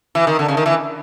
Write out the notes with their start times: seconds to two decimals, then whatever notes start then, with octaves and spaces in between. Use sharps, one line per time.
0.15 E3
0.27 D#3
0.39 D3
0.48 C#3
0.57 D#3
0.66 E3